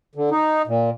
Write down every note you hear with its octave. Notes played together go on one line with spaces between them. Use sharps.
D3
D#4
A#2